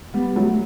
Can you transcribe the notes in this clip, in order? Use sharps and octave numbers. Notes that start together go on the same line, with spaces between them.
G3 B3
F#3 A3